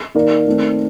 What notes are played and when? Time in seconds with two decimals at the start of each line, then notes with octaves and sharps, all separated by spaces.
0.15 D#3 A#3 D#4 A#4 D5
0.47 D#3 A3 C4